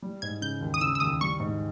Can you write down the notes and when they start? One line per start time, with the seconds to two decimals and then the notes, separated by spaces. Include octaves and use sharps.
0.02 G3
0.22 G#2 G#6
0.42 C#3 G6
0.61 D#2
0.74 D#6
0.81 C#3 E6
0.95 E6
1.00 D#2 D#6
1.21 G3 C#6
1.40 G#2